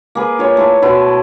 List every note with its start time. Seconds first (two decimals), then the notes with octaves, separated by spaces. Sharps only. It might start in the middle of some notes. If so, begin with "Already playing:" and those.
0.15 A#3 G#4 B4
0.39 F4 C#5 G#5
0.57 A3 E4
0.82 B2 E4 B4 C6